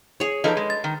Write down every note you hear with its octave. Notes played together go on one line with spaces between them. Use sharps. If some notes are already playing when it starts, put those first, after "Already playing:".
G#4 C#5
F3 D#4 A4 B4 D#5 G5
G#3
A6
D#3